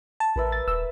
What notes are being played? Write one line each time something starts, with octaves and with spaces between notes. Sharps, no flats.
A5
A1 A#4 B4 E5
A6
D#1 E6